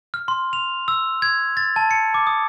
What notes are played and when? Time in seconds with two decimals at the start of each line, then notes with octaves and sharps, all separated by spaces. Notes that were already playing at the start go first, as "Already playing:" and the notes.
0.14 F6
0.28 C6
0.53 F7
0.88 E6
1.22 G#6
1.57 A6
1.76 A5
1.91 C#7
2.14 D6
2.27 D#6